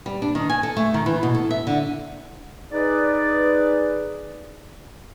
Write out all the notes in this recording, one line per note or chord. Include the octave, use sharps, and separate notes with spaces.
G3
D4
D#3
G#5
A4
A3
D#3
E3
B2
A4
E5
D3
D#4 G#4 B4 D5